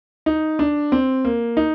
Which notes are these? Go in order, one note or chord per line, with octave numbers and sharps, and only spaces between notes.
D#4
D4
C4
A#3
D#4